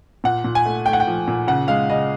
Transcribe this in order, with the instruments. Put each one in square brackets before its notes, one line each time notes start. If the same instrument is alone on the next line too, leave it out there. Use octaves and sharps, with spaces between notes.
[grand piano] A#2 F#5
A#2
G#5
A3
A3 G5
F#5
G5
F3
A#2
C#3 F#5
G#3 F5
C#3 D#5